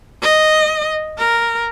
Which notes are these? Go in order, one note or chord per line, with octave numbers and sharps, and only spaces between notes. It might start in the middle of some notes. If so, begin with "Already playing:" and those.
D#5
A#4